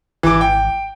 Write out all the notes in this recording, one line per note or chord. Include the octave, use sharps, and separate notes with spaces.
G#1 E3 D6
G5